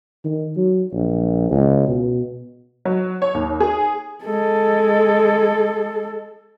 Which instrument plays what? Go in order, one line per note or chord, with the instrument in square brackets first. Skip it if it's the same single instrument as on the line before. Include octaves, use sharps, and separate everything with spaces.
[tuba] D#3
F#3
A#1
C#2
B2
[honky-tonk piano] F#3
C#5
D#2
G#4
[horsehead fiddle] G#3 A4